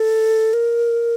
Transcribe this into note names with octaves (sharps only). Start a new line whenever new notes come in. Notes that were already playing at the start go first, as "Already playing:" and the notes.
Already playing: A4
A#4